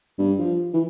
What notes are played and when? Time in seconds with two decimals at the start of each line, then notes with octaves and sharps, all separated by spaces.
0.18 G2
0.38 F3
0.74 E3